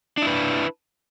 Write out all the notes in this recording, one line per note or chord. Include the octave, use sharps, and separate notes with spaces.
D4 E4 B4